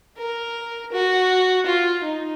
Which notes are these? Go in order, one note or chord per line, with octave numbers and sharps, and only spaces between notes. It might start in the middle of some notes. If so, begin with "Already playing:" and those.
A#4
F#4
F4
D#4